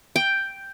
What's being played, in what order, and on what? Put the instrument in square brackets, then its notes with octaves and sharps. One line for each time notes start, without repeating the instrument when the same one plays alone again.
[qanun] G5